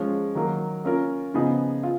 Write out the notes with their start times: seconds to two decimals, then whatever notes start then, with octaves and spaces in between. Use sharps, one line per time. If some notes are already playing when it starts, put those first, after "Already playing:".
Already playing: F3 G#3 C#4
0.35 D#3 F#3 A#3
0.85 A#3 C#4 F4 A#4
1.34 C#3 F3 B3 D#4 G#4
1.83 F4